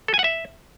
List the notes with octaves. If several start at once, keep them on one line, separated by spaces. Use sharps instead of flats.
A4
G#5
F#5
E5